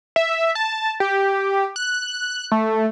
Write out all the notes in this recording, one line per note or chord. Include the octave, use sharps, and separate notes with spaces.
E5
A5
G4
F#6
A3